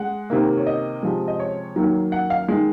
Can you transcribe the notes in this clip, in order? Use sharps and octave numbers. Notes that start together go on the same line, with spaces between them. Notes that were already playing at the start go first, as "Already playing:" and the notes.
Already playing: G#3 F#5
C3 D#3 A#3
C#5
D#5
C3 F3 G#3
D#5
C#5
D#3 F#3 A#3
F#5
F5
D#3 G#3